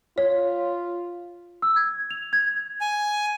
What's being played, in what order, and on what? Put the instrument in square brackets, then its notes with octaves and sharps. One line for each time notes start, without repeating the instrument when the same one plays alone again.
[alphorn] F4 [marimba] C#5
[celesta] E6
G#6
F7
G#6
[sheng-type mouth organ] G#5